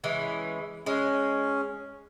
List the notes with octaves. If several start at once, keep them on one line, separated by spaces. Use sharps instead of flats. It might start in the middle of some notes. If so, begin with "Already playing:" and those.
E3 G#3 C#4
G#3 C#4